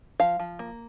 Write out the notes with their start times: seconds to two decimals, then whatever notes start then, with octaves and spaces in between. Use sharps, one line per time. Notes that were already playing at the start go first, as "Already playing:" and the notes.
0.20 F3 F5
0.40 F3
0.59 A#3